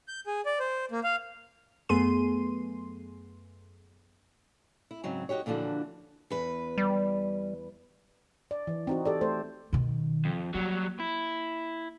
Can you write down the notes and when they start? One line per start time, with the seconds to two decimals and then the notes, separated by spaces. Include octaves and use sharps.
0.08 G6
0.27 G#4
0.46 D5
0.59 C5
0.91 A#3
1.04 F5
1.89 F#2 A3 B3 G#4 C6 D#7
4.91 E4
5.04 G#2 C#3 F#3 C4
5.29 D#4 F#4 G4 C#5
5.46 A#2 D3 E3 F3 D4 F#4
6.30 E2 B4
6.78 G3
8.51 D5
8.67 E3
8.87 C4 D#4 F#4
9.05 G4 A4 D5
9.21 A3 A4 C5
9.73 B2 D#3
10.25 F2
10.54 F#3 G3 A#3
11.00 E4